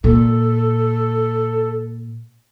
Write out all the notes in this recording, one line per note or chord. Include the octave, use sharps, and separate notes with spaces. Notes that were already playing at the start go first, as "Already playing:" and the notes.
A#2 A4